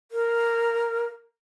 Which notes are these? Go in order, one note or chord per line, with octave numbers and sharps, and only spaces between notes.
A#4